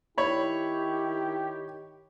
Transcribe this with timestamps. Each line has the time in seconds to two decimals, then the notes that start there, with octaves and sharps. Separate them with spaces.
0.18 D#3 E4 G4 C#5 B5